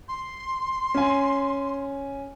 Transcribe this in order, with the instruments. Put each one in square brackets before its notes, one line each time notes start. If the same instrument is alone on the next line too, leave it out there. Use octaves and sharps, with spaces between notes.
[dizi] C6
[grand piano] C#4 G#5